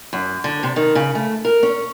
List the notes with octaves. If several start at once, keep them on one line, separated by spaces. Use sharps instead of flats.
F#2
D3
C3
D#3
C#3
A3
A#4
C#4